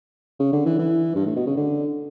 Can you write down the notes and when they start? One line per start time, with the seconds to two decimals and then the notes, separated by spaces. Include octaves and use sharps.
0.39 C#3
0.53 D3
0.65 E3
0.79 E3
1.15 G2
1.26 A2
1.36 B2
1.47 C#3
1.57 D3